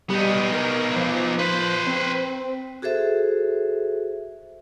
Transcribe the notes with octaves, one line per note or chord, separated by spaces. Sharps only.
G3 B3 D#4
A#4
F3
B4 C5
C4
F#4 G#4 A4 C5 E5